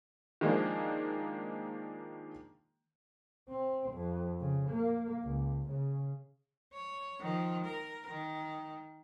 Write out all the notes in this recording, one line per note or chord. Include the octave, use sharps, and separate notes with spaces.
D#3 F3 G#3 A#3 D4
C4
F2
C#3
A#3
C#2
C#3
C#5
D#3 F3
A#4
D#3